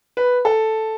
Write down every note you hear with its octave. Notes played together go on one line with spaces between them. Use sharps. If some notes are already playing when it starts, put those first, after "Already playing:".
B4
A4